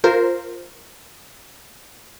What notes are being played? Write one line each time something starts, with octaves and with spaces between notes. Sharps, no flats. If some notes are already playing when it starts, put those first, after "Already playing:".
F4 A#4 C5